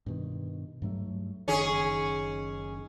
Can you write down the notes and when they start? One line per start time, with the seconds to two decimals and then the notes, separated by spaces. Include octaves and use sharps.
0.06 G2 B2 D#3
0.82 G2 F#3 A3
1.48 F#1 D#3 C#4 G#4